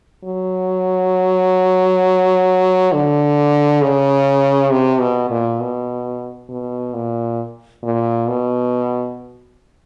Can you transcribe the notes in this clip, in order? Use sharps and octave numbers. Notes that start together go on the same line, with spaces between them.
F#3
D3
C#3
C3
B2
A#2
B2
B2
A#2
A#2
B2